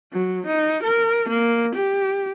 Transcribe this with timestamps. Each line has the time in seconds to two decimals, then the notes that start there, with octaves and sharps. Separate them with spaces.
0.13 F#3
0.47 D#4
0.83 A#4
1.29 A#3
1.75 G4